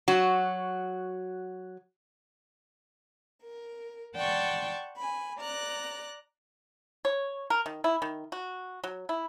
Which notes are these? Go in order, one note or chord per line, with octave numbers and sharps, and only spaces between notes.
F#3 F#4
A#4
D5 F#5 G5 A5 C6 C#6
G#5 B5
D5 A#5 F#6
C#5
A#4
D#3
E4
D#3
F#4
F#3
E4